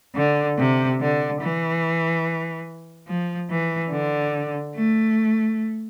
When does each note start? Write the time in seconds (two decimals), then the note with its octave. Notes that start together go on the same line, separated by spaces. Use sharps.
0.16 D3
0.58 C3
1.01 D3
1.41 E3
3.08 F3
3.50 E3
3.91 D3
4.76 A3